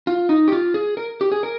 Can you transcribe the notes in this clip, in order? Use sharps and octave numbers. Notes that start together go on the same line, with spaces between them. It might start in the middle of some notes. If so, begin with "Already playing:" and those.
F4
D#4
G4
F4
G#4
A#4
G4
G#4
A#4